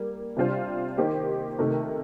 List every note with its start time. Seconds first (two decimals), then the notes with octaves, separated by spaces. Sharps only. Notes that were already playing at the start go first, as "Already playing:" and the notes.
Already playing: G3 A#3
0.36 C3 G3 D4 F4 C5
0.97 D#3 A#3 D#4 G4 C5
1.58 C3 D#3 A3 D#4 A#4